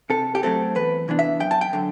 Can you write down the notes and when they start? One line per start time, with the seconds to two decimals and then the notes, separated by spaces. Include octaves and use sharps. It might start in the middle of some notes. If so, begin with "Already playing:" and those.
0.10 C3 A4
0.35 G4
0.43 F#3 A3 C4 A4
0.75 E2 B4
1.08 C3 E3 B3 D4
1.19 E5
1.40 F#2 G5
1.51 A5
1.61 G5
1.73 D3 F#3